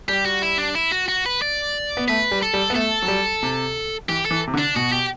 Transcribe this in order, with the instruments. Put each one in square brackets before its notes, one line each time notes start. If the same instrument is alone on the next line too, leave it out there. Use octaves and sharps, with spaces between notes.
[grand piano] G3 [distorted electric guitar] G4
[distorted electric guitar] F#4
E4
D4
E4
F#4
F#4
B4
D5
[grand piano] B3
[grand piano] A3 [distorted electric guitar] B4
[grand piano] G3
[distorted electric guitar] A4
[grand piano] G3
B3
[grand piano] A3 [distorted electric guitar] A4
[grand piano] F#3
G3
C3
[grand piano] E3 [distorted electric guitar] G4
[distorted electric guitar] A4
[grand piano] E3
C3
D3
[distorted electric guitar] D4
[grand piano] B2 [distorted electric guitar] F#4
[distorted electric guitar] G4